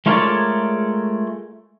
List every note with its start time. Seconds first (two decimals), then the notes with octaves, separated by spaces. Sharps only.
0.06 G#3 A3 F4 A#4 C#5 D5